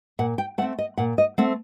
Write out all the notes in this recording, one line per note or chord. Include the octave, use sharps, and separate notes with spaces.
A#2 F#5
G5
A3 C4 F#5
D#5
A#2 F#5
D#5
A3 C4 F#5